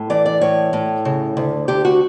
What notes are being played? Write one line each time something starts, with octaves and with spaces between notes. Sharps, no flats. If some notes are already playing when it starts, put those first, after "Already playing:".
Already playing: A2
E3 D5
D5
A2 C#5
A2
C#3
D2
D2 G4
F#4